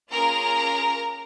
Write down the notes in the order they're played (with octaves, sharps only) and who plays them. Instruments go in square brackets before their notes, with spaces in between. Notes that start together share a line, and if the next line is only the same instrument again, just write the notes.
[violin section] A#3 C#4 F4 G#4 A#4 A#5